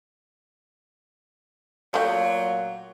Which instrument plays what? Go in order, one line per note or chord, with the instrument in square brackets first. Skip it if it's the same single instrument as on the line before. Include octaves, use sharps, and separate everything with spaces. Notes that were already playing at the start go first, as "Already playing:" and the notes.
[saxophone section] A#2 F#3 [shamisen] A3 F#4 G4 [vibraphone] F5